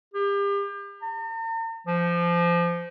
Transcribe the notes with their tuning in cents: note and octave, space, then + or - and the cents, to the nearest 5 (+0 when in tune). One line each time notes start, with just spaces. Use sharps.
G4 +35
A#5 -45
F3 -20